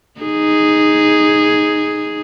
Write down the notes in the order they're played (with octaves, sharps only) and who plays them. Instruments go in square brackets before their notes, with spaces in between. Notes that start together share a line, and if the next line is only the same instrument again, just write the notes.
[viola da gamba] D#4 G#4